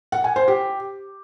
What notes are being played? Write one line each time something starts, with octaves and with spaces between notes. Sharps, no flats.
F#5
G#5
C5
G4